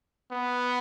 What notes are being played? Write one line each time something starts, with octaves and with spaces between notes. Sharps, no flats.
B3